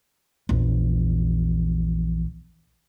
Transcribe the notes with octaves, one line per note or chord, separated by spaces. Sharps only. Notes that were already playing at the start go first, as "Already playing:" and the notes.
A#1 E2